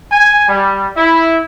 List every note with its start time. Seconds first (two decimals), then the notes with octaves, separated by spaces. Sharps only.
0.12 G#5
0.48 G3
0.96 E4